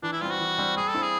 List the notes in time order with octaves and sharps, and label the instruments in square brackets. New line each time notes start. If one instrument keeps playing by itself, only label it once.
[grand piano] E3 [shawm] D4
[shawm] E4
[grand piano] G3 [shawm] F4
[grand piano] C4
[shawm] F#4
[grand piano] E3
G3 C4
[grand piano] G3 [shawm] G#4
[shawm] A4
[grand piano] C4 E4
[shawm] G#4